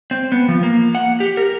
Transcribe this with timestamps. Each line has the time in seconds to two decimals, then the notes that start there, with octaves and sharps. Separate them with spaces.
0.11 C4
0.32 B3
0.48 F3
0.63 A#3
0.95 F#5
1.20 G4
1.37 A#4